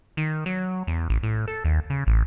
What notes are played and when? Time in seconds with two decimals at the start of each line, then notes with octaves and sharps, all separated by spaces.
0.17 D#3
0.46 F#3
0.87 E2
1.10 A1
1.23 A2
1.48 A4
1.65 D#2
1.90 C#3
2.07 A1